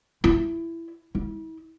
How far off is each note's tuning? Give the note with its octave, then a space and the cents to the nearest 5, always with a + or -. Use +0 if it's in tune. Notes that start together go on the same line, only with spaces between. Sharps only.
E4 +15
E4 -40